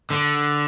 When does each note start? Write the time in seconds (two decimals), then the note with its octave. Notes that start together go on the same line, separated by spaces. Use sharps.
0.10 D3